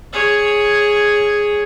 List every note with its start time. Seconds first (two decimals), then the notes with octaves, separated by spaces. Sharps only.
0.13 G#4 C#5